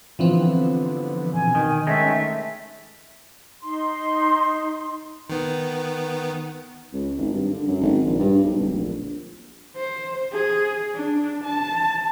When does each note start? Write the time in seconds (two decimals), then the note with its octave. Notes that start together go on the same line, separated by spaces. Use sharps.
0.19 D3 E3 F3 B3 C4
1.34 B2 G#5
1.55 D#3
1.87 D#3 G#3 A3 C#4 E5
3.62 D#4 C6
5.30 D#3 B3
6.93 C#2
7.17 G#1
7.32 G2
7.53 D3
7.67 F#2
7.81 G#1
8.05 A#1
8.19 G2
8.43 B1
8.59 D1
8.73 A#1
9.76 C5
10.33 G#4
10.95 D4
11.44 A5